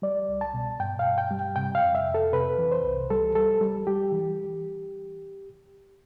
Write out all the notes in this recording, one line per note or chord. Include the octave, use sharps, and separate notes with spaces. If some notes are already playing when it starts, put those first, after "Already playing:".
G3 D5
C2
A5
B2
G2 G5
F5
G2
G5
G3
C3 G5
F5
F2
E5
F2
A4
C3 B4
E3
C5
C2
G3 A4
G3 A4
G3
G3 G4
E3